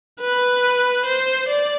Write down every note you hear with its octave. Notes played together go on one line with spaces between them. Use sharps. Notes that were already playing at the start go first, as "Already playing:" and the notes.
B4
C5
D5